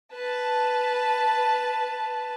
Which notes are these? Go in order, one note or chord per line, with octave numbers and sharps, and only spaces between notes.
B4 A5